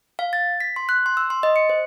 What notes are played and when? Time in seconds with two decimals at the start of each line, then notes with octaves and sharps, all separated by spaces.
0.19 F5
0.33 A6
0.60 B6
0.76 C6
0.89 F#6
1.06 C6
1.17 E6
1.30 C6
1.43 D#5
1.56 C#7
1.69 C5